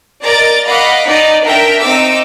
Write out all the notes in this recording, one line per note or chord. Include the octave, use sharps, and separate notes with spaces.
A#4 D5 D#5 A#5 D6 A6
D#5 F5 F#5 B5 D6
D#4 D5 D#5
D4 A#4 E5 G5
C4 D#4 D6 E6